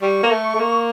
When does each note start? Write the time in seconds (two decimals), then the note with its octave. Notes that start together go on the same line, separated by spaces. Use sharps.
0.02 G3 C#6
0.23 A#3
0.30 A3
0.55 A3
0.60 A#3